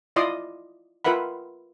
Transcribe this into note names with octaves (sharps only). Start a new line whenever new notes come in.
E4 F4 D5 D#5 C6 D#6
F4 A#4 B4 E5 F#5 B5